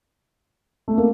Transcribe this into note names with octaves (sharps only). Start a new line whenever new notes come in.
A3
A#3